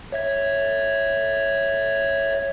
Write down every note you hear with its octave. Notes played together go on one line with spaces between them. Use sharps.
C#5 E5 G#6